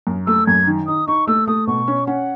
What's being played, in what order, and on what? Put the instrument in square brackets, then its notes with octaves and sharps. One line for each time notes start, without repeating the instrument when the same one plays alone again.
[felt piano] F#2
[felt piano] A3 [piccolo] E6
[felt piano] F#2 [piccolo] G#6
[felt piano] D#3
[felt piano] D#4 [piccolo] D#6
[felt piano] D#4 [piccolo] C#6
[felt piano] A3 [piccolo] E6
[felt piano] A3 [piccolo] D#6
[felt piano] B2 [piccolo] C#6
[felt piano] C#4
[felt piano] C#4 [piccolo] F#5